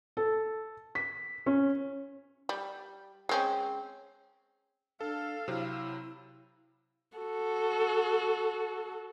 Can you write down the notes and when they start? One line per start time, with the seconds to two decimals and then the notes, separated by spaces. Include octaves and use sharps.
0.17 A4
0.95 B6
1.46 C#4
2.49 G3
3.29 G#3 C4 C#4
5.01 D4 A4 F5
5.48 C3 F#3 C4 E4
7.17 F#4 A4